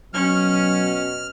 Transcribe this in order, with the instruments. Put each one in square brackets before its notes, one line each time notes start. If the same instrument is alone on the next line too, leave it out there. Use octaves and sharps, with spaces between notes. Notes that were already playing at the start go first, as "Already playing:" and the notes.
[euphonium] B2 [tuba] F#3 [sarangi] C#4 [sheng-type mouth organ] F6